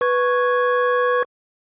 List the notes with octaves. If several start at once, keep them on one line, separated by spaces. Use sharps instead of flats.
B4 C#6 G#6